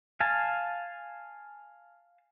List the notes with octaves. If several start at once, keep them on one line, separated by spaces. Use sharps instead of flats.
F5 G#5 A5